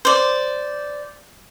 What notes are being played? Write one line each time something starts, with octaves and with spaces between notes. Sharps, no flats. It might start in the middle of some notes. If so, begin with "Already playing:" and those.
C5 D5